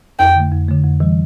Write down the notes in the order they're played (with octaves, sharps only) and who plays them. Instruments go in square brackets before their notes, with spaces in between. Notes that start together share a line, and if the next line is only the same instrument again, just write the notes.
[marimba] F2 [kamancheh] G5
[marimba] D3 A3
F2
D3 A3
F2
E3 G3